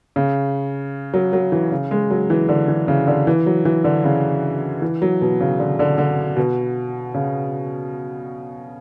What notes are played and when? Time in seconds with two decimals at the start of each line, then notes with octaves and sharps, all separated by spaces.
0.16 C#3
1.14 F#3
1.33 F#3
1.52 E3
1.72 C#3
1.91 G#3
2.10 F#3
2.30 E3
2.49 D3
2.68 E3
2.88 C#3
3.07 D3
3.27 E3
3.46 F#3
3.65 E3
3.84 D3
4.04 C#3
4.82 E3
5.02 F#3
5.21 B2
5.40 C#3
5.59 D3
5.79 D3
5.98 D3
6.37 B2
7.14 C#3